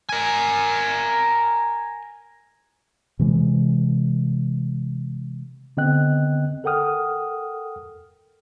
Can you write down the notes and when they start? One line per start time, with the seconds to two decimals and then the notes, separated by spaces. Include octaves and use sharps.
0.09 A#4 G#5
3.19 C3 E3 G#3
5.77 D3 B3 C4 D#5 G5 F#6
6.64 A4 A#4 F#5 G5 D#6 F6